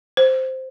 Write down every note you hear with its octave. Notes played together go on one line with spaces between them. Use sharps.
C5